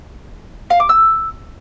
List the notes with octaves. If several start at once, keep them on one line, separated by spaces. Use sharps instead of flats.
F5
D6
E6